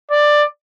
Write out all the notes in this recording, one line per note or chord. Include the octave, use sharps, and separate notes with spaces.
D5